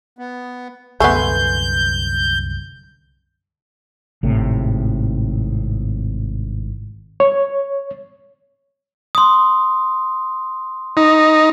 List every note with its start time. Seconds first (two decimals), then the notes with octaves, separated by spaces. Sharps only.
0.19 B3
1.00 C2 F#2 D3 A3 B3 G#5 C6 G6
4.23 G#1 A2 C3
7.20 C#5
9.15 C6 D#6
10.97 D#4